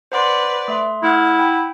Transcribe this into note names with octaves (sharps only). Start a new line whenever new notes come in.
B4 C5 D5 F#5 C6
A3 E5 C6
A3 E4 F#5 F6 G#6
G5 B5